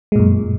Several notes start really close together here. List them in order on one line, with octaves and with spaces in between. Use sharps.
G#3 A#2 F#2